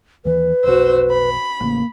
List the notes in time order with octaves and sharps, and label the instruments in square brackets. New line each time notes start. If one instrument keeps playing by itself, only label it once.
[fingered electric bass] D#2 E3 [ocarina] B4
[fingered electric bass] F1 B1 [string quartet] F#4 C5 E6
[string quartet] B5
[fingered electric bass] A1 C#3 [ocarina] A#3